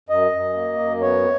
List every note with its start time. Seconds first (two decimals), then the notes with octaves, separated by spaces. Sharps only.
0.09 F#2 D#5
0.32 F#2
0.55 A#3
0.79 F#2
1.01 B3 C#5